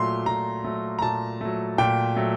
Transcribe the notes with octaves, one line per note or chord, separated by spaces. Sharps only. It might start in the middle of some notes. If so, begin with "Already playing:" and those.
Already playing: A#2 F#3 A3 C6
A#2 A#5
F#3 A3
A#5
A#2 A5
F#3 A3
A#2 G5
F#3 A3